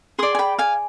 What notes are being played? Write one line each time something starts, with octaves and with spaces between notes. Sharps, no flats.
G#4 D5 C6 D#6
G#5
G5 B5
F5 G#5